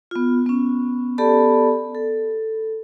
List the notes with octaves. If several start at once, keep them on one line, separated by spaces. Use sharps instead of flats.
B3 F4
B3 C#4
B3 G4 A4 D5 A5 B5
A4